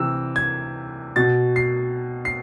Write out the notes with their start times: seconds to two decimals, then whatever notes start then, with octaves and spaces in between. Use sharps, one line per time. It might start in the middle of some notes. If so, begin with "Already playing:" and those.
Already playing: C3 E3 E6
0.36 G#6
1.16 B2 A6
1.56 C7
2.25 C7